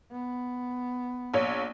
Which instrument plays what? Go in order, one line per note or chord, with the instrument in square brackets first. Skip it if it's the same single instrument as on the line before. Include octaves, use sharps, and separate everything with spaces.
[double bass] B3
[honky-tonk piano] A#1 C#5